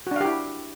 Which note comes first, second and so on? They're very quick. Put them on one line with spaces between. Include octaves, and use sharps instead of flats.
F#4 D4 F5 G4 E4